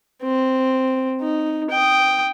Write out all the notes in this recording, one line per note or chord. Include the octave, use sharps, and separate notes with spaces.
C4
D#4
G5 D#6